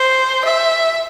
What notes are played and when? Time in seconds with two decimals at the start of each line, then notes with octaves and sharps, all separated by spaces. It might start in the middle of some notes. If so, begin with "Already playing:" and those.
Already playing: C5
0.45 E5